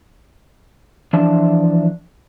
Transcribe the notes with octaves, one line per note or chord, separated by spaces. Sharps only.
E3 F3 D4 E5 A5